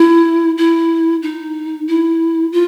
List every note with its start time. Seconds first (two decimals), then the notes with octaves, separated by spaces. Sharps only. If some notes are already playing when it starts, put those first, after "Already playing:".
Already playing: E4
0.58 E4
1.22 D#4
1.88 E4
2.52 F4